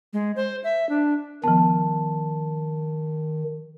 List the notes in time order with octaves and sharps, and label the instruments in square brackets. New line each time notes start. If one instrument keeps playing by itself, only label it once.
[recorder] G#3
C5
E5
D4
[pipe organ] D#3 [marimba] F3 B3 [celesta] A5